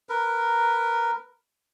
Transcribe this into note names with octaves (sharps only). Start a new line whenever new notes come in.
A#4 B4